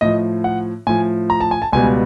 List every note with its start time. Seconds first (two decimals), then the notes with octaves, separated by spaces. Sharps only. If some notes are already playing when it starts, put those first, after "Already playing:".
0.01 A2 F3 D#5
0.44 F#5
0.87 A2 F3 G#5
1.30 A#5
1.41 A5
1.51 G#5
1.62 A5
1.73 C#2 B2 G3 G#5